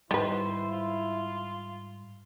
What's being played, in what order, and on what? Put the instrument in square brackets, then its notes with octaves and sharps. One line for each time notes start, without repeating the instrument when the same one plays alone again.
[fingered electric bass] G#2 G3 [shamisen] D#3 B4 [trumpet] E4 [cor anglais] C5
[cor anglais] F4